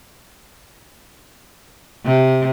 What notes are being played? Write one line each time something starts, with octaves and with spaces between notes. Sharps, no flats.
C3